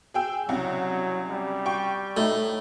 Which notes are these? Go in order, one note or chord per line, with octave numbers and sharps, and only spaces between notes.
G#4 G5 E6
C2 C#3 F#3
G3
G5 C#6
A2 D#4